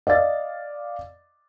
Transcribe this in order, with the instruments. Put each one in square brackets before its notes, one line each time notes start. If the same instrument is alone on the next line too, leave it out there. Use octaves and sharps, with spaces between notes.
[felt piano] D5 D#5 F5 A6